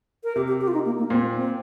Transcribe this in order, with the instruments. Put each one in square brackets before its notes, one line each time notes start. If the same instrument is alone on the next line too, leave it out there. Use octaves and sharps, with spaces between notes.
[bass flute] A#4
[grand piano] C3 [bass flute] G4
[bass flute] G4
G4
F4
D#4
A#3
A#3
[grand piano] A#2 [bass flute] C4
[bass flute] C4